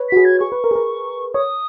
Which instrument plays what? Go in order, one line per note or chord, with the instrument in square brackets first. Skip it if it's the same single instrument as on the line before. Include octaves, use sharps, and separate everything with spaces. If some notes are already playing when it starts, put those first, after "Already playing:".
Already playing: [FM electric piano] B4 C#5
[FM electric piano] F#4 [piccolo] B6
[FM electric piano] G#4
[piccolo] G#6
[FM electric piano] G#4 [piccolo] C#6
[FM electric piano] B4
A#4
G#4
A#4
[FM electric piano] C#5 [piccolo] D#6